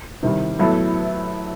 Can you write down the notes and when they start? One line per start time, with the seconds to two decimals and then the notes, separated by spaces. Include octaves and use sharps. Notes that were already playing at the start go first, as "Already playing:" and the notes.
0.23 C3 D#3 G3
0.59 A2 F#3 B3 E4 A4